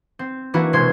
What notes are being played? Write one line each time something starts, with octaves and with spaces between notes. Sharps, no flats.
C4
E3 A#3 D4 E4 F#4
E1 C3 G#3 C5 C6 G#6